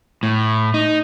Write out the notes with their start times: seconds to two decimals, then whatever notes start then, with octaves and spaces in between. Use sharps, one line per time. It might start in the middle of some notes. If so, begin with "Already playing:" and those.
0.23 A2
0.74 D#4